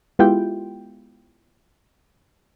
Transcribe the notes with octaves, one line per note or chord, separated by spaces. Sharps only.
G#3 B3 E4 F4 G4 G5